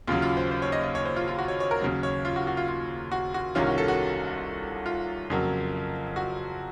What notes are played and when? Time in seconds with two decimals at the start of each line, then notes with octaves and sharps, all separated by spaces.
0.08 D#2 C#3 F#3 F4
0.22 F4
0.37 C5
0.51 C5
0.62 C#5
0.72 D#5
0.83 D#5
0.95 C#5
1.05 C5
1.16 F4
1.28 F4
1.38 F#4
1.48 C#5
1.60 C#5
1.71 A#4
1.82 D#2 C#3 F#3
2.03 C#5
2.25 F4
2.36 F#4
2.47 F#4
2.57 F4
2.68 F4
3.12 F#4
3.34 F#4
3.55 C2 C3 D#3 A#3 C#4 F4
3.66 F#4
3.78 A4
3.88 F#4
4.86 F4
5.30 F2 C#3 F#3 A#3
6.16 F#4